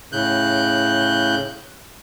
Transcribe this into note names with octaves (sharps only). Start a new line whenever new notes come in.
A2 C#3 F#6 G6